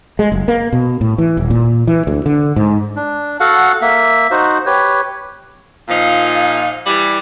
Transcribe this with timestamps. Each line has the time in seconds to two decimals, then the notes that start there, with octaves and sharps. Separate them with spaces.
0.19 G#3
0.32 F#1
0.48 A#3
0.73 B2
1.01 A2
1.18 E3
1.37 D#1
1.50 A#2
1.87 E3
2.07 D2
2.26 D3
2.56 G#2
2.96 D4
3.40 F#4 A4 F5 F#5
3.82 A#3 E5
4.31 D#4 F#4 C5
4.66 G4 B4 C#5
5.88 A#2 F3 D#4 F5
6.87 E3 G3